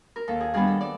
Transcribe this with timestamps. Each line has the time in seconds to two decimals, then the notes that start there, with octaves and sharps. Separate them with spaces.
0.16 A#4
0.28 D#2 A4
0.40 G#4
0.54 D#3 G3 B3 D4 G#4
0.67 A4
0.81 D5